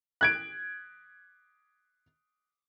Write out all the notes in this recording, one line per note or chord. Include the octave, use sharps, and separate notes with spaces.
F#6 G#6 D7